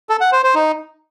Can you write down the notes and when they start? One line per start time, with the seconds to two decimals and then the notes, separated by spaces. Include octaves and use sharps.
0.09 A4
0.21 F#5
0.32 C5
0.44 C5
0.55 D#4